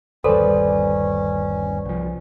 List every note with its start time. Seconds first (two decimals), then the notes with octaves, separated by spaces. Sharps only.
0.24 G1 D#2 G3 C#4 A4 B4 C5 D5
1.85 C2 F3